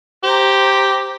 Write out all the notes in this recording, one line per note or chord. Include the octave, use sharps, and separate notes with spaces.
G4 C5 A#5